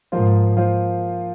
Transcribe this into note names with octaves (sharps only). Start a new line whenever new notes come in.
G#2 F3 A#3 F4 C5
F3 A#3 F4 C5